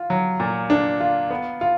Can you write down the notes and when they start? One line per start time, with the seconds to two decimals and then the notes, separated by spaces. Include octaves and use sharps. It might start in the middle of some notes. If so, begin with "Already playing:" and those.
Already playing: F4
0.10 F#3
0.40 A#2
0.70 D4
1.00 F4
1.30 B3
1.61 F4